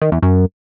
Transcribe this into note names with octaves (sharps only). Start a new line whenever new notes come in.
D#3
E2
F#2